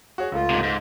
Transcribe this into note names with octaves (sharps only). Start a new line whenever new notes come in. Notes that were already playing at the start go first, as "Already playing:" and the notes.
F#4 G#4 C#5
C#2 A3 F4
G#2 C3
G#2